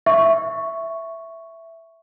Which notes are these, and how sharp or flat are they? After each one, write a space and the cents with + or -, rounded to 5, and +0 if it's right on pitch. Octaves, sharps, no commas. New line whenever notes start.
E5 +0 C#6 +0